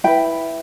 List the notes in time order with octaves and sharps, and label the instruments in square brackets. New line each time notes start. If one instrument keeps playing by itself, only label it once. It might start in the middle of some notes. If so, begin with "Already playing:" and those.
[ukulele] E4 B4 G5